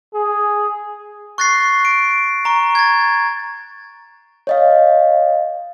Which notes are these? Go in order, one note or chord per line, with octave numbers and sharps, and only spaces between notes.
G#4
C#6 F#6 A6 A#6 C7
D7
A#5 C#6
G#6 A6
C#5 D#5 F5